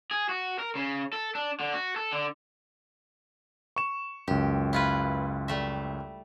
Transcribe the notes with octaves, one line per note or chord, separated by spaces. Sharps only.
G#4
F#4
A#4
C#3
A4
D4
D3
F#4
A4
D3
C#6 E7
C#2 F#2 G4
E4 F4 B4
G3 A3 E5